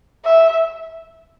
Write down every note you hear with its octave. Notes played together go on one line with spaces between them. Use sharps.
E5